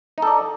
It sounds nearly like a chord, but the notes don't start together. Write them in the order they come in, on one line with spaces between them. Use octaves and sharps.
D#4 A4 D5